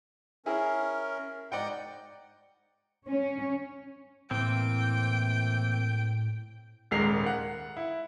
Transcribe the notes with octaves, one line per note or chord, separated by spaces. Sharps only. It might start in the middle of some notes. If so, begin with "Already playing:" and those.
C#4 E4 G#4 A#4
G#2 D5 D#5 F#5 G5 G6
C#4
A2 E3 A#3 C4 G5
D#1 G#2 G#3 A#4 C7 F7
F#5
E4